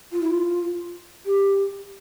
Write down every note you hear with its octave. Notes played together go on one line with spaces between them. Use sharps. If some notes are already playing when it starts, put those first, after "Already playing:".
F4
E4
F4
G4